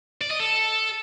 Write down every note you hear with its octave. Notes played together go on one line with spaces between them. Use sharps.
D5
D#5
A4